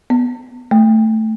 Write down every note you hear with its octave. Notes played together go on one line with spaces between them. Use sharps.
B3
A3